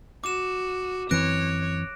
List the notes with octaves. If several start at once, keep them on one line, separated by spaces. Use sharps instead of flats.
F#4 D6 E7
F#2 E3 C4 C#5 F#6 A#6 D7